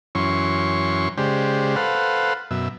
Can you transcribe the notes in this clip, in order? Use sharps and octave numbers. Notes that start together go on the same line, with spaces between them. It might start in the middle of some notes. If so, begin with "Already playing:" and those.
F#2 E3 C#4 C6 C#6
C#3 G#3 G4 C5 D5
A4 B4 C5 F5 F#5
F#2 B2 E5